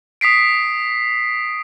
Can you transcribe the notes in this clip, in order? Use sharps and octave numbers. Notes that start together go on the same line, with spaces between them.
D#6 B6 C7 D7